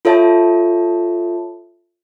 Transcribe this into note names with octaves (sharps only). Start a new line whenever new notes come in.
F4 A4 C#5 E5 A5